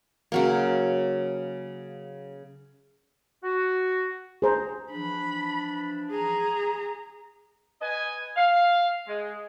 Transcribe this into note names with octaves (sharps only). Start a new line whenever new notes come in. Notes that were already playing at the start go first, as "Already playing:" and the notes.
C#3 F#3 A#3
F#4
G#4 C5 A#5
E3 F3 D4 B5
G#4 A#5
B4 D#5 G#5
F5
G#3